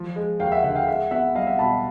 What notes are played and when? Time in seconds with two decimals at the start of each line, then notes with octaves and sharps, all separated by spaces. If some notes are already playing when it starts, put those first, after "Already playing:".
Already playing: F3
0.16 G#3
0.40 D#2 F5 G5
0.52 E5 F#5
0.64 D3 E5 F#5
0.75 F5 G5
0.87 G#3 E5 F#5
1.11 B3 E5 F#5
1.35 C2 D#5 F5
1.47 E5 F#5
1.59 B2 A5 B5